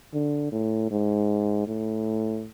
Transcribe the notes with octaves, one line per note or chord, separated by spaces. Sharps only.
D3
A2
G#2
A2